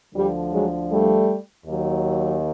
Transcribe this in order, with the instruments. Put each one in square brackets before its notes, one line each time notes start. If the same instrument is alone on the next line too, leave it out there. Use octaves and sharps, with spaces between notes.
[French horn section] D2 D3 F3 G3
F#3 G#3
G3 A3
D#2 D#3 F#3